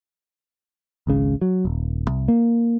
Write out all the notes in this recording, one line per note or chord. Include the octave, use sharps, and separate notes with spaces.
G#1 C#2 C#3
F#3
D#1
C2
A#3